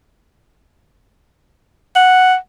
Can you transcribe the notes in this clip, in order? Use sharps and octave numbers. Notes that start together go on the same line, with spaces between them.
F#5